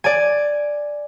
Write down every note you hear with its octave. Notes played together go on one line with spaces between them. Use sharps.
D5 G#5